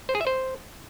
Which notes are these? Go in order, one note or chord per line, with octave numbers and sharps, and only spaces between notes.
C5
G#4
E5
C5